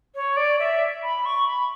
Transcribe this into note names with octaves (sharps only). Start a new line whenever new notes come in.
C#5
D5
E5
B5
C#6
B5